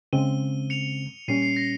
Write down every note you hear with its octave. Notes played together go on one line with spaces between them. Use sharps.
C#3 G#3 C4 D#7 G7
C#7 F7
A#2 G3 C#4 C7 D#7
C7
A#6